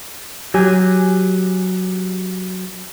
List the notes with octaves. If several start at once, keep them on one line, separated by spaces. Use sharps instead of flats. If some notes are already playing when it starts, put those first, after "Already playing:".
F#3 G4 G#5